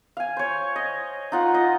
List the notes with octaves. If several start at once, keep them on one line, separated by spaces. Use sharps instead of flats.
F5 G#5
C5 C#5
D#5
D#4 F4 F#5
D#5